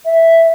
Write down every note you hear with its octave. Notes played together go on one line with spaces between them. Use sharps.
E5